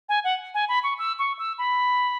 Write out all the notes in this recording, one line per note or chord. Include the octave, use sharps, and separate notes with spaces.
G#5
F#5
G#5
B5
C#6
E6
C#6
E6
B5